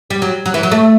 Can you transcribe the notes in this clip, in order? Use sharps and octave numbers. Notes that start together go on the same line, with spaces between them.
G3
F#3
F#3
E3
F#3
A3